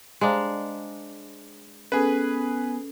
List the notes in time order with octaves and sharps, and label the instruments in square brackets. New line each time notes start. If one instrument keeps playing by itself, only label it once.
[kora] G#3 D4 [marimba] C5 F5 A#5
[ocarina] B3 [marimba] C#4 A4 [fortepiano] G#4 B4